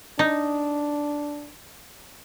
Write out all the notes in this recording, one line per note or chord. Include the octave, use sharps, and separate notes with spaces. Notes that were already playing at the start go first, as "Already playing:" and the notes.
D4 D#4